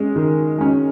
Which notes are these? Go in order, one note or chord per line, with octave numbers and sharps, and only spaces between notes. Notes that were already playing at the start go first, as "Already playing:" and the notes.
Already playing: G#3 C#4
D#3
G#3 C#4